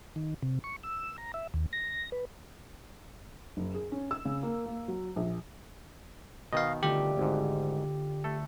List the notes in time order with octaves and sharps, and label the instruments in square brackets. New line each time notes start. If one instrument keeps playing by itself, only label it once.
[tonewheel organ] D#3
C3
C#6
E6
A#5
E5
D#2
A#6
B4
[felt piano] F#1
G#4
C#4
E6
C#3
A#3
A#3
F#3
A#1
[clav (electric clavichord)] B2 D#3 [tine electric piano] D#5 F5
[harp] D3 A3 F4 [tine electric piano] G4
[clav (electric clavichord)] G#1 G#2
A3 A4